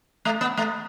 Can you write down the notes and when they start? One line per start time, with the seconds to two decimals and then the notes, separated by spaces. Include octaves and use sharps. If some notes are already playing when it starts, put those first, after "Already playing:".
0.25 A3
0.41 B3
0.57 A3